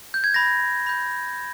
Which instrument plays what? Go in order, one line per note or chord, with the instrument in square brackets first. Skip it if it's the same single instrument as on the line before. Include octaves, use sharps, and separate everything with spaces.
[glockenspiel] G6
G#6
B5 G6 A#6
B5 G6